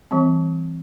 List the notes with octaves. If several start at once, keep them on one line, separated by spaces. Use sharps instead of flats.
E3 G3 C4